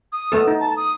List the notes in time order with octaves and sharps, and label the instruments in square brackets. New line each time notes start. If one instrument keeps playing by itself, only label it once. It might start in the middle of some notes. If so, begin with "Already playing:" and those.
[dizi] D#6
[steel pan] A3 B3 A4
D#4
[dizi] A5
D#6